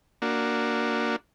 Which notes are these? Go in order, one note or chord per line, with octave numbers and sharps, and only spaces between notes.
A#3 D4 F#4